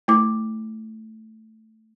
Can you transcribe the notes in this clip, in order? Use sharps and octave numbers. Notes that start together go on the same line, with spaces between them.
A3 E4 D6